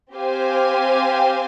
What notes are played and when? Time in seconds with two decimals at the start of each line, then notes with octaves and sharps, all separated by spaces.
0.13 C4 G4 C5 F5 G#5